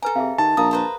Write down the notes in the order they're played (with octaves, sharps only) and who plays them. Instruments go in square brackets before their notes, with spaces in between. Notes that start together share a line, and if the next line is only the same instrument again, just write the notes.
[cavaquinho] A4 A#5 [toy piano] B4 G#5
[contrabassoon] C3 [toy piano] G#4 E5 F5
[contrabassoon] D#3 [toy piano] G4 [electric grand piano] A5
[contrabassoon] A#1 [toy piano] A#4 F5 D#6 [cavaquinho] A#5
[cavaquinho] B4 C5 A#5